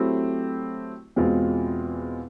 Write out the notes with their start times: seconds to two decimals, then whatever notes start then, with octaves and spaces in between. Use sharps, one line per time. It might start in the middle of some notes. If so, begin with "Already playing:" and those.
Already playing: F#3 A3 C4 E4 G4
1.16 E2 B2 G#3 C4 F4